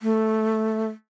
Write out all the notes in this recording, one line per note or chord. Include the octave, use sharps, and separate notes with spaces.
A3